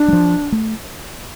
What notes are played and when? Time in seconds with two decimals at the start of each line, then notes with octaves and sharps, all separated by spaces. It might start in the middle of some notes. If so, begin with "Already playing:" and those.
Already playing: D4
0.08 G3
0.13 F3
0.52 A3